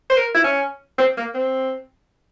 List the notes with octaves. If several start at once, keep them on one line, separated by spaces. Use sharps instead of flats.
C5
A#4
E4
C#4
C4
A#3
C4